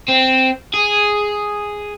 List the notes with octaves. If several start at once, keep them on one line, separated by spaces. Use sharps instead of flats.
C4
G#4